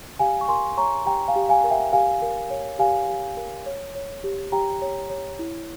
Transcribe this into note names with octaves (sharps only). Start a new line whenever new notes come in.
G4 F5 G#5
C#6
A#4 G#5 C6
C#5 A#5 C#6
G4 G5 A#5
F5 G#5
G4
F5 G#5
A#4
E5 G5
G4 F5 G#5
A#4
C#5
G4 F5 G#5
G4
A#4
C#5
C#5
G4
G4 G5 A#5
C#5
C#5
E4